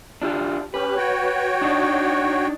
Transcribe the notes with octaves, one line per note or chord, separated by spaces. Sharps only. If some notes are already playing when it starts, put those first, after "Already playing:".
D4 F4 G4
C#4 G4 B4
F#4 C#5 G5
D4 D#4